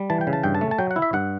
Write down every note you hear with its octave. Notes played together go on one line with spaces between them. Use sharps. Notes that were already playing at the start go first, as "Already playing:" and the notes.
Already playing: G3
E3 A5
G5
C#3
A5
G2 G5
A5
A3
A5
F#3 G5
F#5
E4
E5
G2 F#5